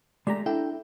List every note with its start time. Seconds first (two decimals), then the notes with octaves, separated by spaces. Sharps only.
0.27 G#3 A3 G4 D5 A#5
0.46 D4 E4 A4 G5